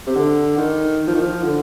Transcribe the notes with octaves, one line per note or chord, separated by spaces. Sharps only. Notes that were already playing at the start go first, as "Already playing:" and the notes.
C3
D3
D#3
F3
D#3
F3
D3